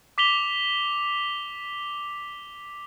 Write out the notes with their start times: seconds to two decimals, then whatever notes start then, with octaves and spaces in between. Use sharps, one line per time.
0.18 D6 B6 F7 G7